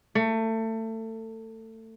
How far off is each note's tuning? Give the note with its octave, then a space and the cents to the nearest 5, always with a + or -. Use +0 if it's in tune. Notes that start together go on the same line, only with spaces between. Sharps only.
A3 +25